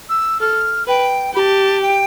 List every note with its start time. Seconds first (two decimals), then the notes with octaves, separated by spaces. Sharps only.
0.09 E6
0.40 A4 F6
0.87 B4 G5
1.34 G4 A5 B5
1.82 G5